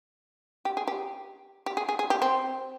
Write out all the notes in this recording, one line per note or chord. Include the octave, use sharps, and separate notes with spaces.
G4
G#4
G4
G4
G#4
G#4
G#4
G4
C4